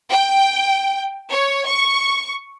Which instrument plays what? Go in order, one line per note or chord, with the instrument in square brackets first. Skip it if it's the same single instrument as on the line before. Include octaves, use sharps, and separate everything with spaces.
[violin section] G5
C#5
C#6